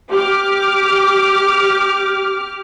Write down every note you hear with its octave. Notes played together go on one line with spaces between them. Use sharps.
G4 D6 F6